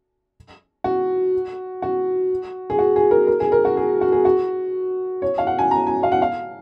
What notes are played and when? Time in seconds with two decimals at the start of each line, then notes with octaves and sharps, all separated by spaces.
0.84 F#4
1.82 F#4
2.70 G#4
2.79 F#4
2.96 G#4
3.11 A#4
3.27 A#4
3.40 G#4
3.52 A#4
3.65 F#4
3.77 G#4
4.01 F#4
4.12 G#4
4.25 F#4
5.22 C#5
5.38 F5
5.47 F#5
5.59 G#5
5.71 A#5
5.87 G#5
6.03 F5
6.12 F#5
6.22 F5